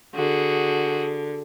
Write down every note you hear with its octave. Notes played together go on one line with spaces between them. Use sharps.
D3 F#4 G#4